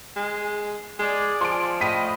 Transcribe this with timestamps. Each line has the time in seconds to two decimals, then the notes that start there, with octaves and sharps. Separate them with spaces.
0.16 G#3
1.00 G#3 G#4 D5
1.41 F3 C6 D7
1.81 A2 D#5 B6 D#7